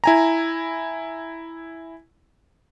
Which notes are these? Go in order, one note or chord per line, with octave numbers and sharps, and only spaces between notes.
E4 G#5 A#5